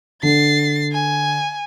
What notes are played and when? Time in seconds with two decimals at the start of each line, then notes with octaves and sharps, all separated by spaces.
0.23 D3 A6 C7
0.92 G#5